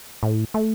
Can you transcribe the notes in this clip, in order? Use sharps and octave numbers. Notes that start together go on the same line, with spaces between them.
A2
A3